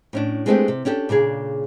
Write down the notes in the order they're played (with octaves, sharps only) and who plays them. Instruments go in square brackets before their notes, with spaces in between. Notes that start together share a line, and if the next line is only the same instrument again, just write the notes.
[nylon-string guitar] A2 C#4 D4
G#3 A3 B3 C4 D4 G4
C3
C#4 D4 G4 A4
A#2 C#3 D4 G#4